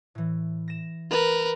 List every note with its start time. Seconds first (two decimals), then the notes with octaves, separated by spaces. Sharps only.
0.15 A2 E3
0.68 A#6 E7
1.10 A#4 B4